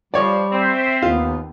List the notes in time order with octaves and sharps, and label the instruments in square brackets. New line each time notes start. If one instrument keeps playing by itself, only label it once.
[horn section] F3 [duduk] G3 [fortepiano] C#5 D5
[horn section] C4 [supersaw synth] C5 E5
[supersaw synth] D#2 [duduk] B3 [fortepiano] F4